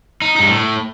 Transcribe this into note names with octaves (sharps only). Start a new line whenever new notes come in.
D#4
G2 D#4
A2